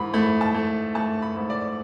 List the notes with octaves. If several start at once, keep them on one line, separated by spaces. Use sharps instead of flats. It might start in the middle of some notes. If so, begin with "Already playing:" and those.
Already playing: G#2 E3 B5
A3 B5
A5
A3
A3 A5
B5
G#2
D5